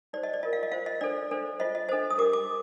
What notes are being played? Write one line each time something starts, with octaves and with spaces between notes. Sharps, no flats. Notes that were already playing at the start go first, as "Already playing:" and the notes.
D#4 G4 C5 D5
D#5
D5
F4 A#4 D#5
F5
D#5
F4 C5 F5
D#5
D4 A4 C5 D5
D4 A4 C5
F4 C5 D#5
D#5
D4 A4 C5 D#5
D#6
D4 G4 A#4 D6
D6